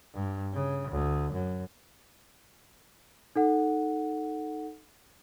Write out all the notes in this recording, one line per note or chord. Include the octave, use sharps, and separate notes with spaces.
G2
C#3
D2
F#2
D#4 A4 F#5